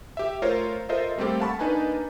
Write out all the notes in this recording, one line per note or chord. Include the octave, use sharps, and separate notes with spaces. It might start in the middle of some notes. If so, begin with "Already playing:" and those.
G4 E5
A3 F4 A#4 C5 C#5 F5
F4 A4 A#4 C5 D#5 E5
G3 A3 A#3 C4 G4 A4
F5 F#5 A5 B5 C#6
A#3 D4 D#4 B4 G#5 A5